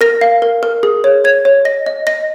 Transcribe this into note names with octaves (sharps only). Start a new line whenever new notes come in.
A#4 A#6
F5
A#4
A#4
G#4
C#5
C#5 G#6
C#5
D#5 A#6
D#5
D#5 A#6